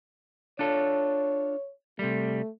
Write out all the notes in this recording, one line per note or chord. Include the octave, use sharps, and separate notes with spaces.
D4 F4 A4 C#5
C3 G3 A3